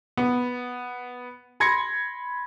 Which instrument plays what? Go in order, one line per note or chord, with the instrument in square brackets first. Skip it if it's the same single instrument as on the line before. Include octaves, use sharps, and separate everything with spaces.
[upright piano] B3
B5 C6 G#6 A#6 C#7